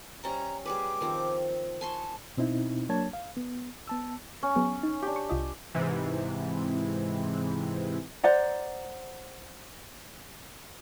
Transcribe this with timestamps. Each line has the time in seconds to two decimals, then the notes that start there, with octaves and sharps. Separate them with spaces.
0.24 G3 C#4 D#5 A#5
0.65 G3 G#4 B4 D6
1.01 D#3 F3 C4
1.81 G#5 A5 C6 C#6
2.37 B2 C4 D#4 E4
2.89 F#3 A#3 D4 C#5 A5 G#6
3.13 F5
3.37 B3
3.88 B3 A5 E6
4.43 C#4
4.56 F#3 B3 G#4
4.83 D#4
5.02 D4 G4
5.16 C#6
5.29 C2 F4 D#5
5.75 G#2 C3 E3
8.23 C5 D5 F#5 A#5